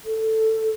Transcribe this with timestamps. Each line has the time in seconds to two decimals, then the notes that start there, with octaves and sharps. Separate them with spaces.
0.05 A4